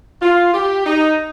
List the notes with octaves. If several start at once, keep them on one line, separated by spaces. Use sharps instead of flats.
F4
G4
D#4